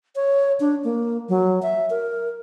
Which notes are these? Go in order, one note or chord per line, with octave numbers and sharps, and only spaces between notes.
C#5
D4
A#3
F#3
E5
A#4